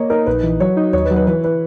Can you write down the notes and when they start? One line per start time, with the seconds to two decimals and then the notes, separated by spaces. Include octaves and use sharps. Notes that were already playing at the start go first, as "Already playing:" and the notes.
Already playing: A#3 C#5 D#5
0.10 D#4 A#4
0.26 A#1 B4
0.43 E3
0.60 F#3 C#5
0.77 D#4
0.93 D#2 C#5
1.05 B4
1.11 F#3
1.16 B4
1.27 E3 B4
1.44 E3 B4